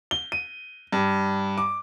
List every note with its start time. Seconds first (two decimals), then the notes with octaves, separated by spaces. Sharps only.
0.11 G7
0.32 D#7
0.92 G2
1.58 D6